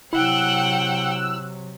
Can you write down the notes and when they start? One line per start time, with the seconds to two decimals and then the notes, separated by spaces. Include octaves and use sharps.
0.13 C3 F#3 E4 F#5 G5 E6 F#6